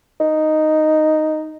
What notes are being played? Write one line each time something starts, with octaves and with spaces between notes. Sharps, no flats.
D#4